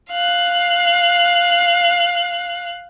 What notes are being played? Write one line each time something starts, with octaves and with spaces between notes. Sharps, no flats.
F5 F#6